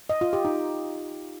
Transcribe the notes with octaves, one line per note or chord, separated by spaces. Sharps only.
D#5
F4
G4
D#4